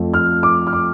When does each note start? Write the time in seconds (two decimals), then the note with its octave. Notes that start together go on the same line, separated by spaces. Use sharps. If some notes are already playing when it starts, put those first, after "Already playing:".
Already playing: F2 F3 A3
0.14 F6
0.43 D6
0.67 F6
0.73 D6